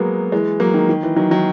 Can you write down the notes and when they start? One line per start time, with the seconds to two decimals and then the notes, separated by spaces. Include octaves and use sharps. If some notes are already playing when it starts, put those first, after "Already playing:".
Already playing: F#3 G#3 A#3 B3
0.32 E3 G#3
0.60 F#3 A#3
0.74 D#3
0.89 D#3
1.03 E3
1.16 D#3 F#3
1.31 D#3 F#3